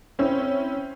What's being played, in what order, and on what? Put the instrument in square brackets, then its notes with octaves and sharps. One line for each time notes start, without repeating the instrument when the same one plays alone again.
[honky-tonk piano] C4 C#4 E4